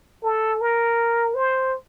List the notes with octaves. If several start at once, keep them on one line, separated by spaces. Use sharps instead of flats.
A4
A#4
C5